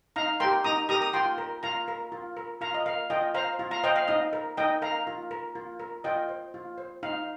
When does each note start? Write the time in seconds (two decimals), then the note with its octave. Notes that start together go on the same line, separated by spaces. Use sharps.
0.16 D#4 F5 A#5
0.40 G4 A#4 G5 C6
0.64 D#4 A#5 D#6
0.89 G4 A#4 A#5 D#6
1.02 D#6
1.13 F4 G5 C6
1.38 A#4
1.63 F4 F5 A#5
1.88 A#4
2.12 F4
2.37 A#4
2.61 F4 F5 A#5
2.74 D#5
2.86 A#4 F5
3.10 F4 D#5 G5
3.34 C5 F5 A#5
3.59 F4
3.71 F5 A#5
3.84 C5 D#5 G5
3.96 F5
4.08 D#4 D#5
4.33 A#4
4.57 D#4 D#5 G5
4.82 A#4 F5 A#5
5.07 F4
5.31 A#4
5.55 F4
5.80 A#4
6.04 F4 D#5 G5
6.29 C5
6.54 F4
6.78 C5
7.03 D#4 F5